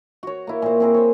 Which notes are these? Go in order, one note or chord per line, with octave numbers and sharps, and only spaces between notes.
F#4 C#5
A#3 E4
A#2 C5
C4 G#4 A#4
C5 C#5